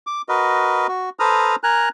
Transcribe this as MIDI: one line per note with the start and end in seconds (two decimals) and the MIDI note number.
0.07 0.22 86
0.29 0.87 66
0.29 0.87 70
0.29 0.87 71
0.29 0.87 75
0.88 1.10 66
1.19 1.56 69
1.19 1.56 71
1.19 1.56 72
1.19 1.56 82
1.19 1.56 87
1.19 1.56 89
1.63 1.89 70
1.63 1.89 80
1.63 1.89 82
1.63 1.89 90